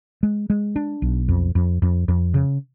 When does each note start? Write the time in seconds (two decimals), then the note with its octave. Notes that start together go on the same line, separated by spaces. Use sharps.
0.23 G#3
0.50 G#3
0.76 D4
1.02 B1
1.28 F2
1.55 F2
1.82 F2
2.08 F2
2.34 C#3